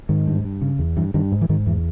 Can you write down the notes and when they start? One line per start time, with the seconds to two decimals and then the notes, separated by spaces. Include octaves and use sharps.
0.09 G#2 D#3
0.27 G2
0.44 G2
0.61 C#3
0.79 E2
0.97 G2 E3
1.14 G2 D#3
1.32 G#2
1.42 E3
1.49 G#2 D#3
1.66 E2 E3